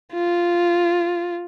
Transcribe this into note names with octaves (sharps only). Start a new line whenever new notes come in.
F4